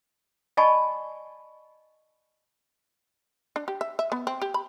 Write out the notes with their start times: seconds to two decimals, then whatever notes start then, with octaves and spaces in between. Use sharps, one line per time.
0.57 D5 D#5 G#5 A5 B5 C#6
3.56 D4
3.68 G4
3.81 E5
3.99 E5
4.12 B3
4.27 C4
4.42 G4
4.54 B5